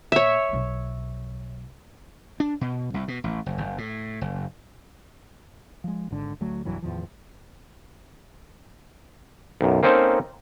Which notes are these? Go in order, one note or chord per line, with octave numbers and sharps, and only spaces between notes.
A#2 C#5 E5
B1 F#3
D4
B2
C2
B2
A1
F#1
F#1
A2
F#1
F3 G#3
G#1 G#2 D3
D2 F#3 A3
C2 G2 E3 F#3
E2 A2 D#3 F3
B1 F#2
A#3 C4 C#4 D#4 A4 C5